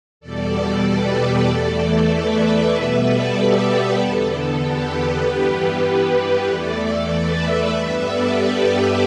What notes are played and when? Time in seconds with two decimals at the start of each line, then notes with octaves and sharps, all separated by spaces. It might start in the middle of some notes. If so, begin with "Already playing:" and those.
0.20 E2 B2 G3 A4 D5
0.83 G4 B4
1.45 E2 E3 A3 A4 D5
2.07 B4 E5
2.70 B2 G3 B3 B4 E5
3.01 A4 D5
3.33 G4 B4
3.95 E2 D3 B3 A4
4.58 G4 B4
5.20 G2 E3 G3 B3
6.45 E2 E3 A3 A4 D5
7.07 B4 E5
7.70 G2 G3 B3 B4 E5
8.02 A4 D5
8.33 G4 B4